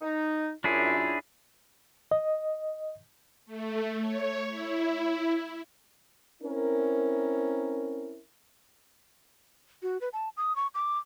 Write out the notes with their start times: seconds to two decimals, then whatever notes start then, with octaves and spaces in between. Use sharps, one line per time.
0.02 D#4
0.64 F#2 D4 E4 F4 G#4
2.11 D#5
3.46 A3
4.01 C#5
4.48 E4
6.43 C4 C#4 E4 A#4
9.83 F#4
10.01 B4
10.13 A5
10.37 D#6
10.56 C#6
10.75 D6